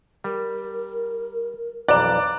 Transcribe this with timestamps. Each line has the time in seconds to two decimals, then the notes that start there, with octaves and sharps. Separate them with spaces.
0.24 G3 A#4
1.88 B1 F2 E3 D5 A#5 F#6